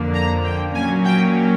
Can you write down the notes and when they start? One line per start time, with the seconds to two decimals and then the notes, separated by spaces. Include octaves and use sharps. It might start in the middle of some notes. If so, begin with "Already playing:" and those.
Already playing: F2 D3 F3 A#3 D4
0.15 A#5
0.44 G5
0.74 A#2 F#3 A#3 C#4 G#5
1.05 G5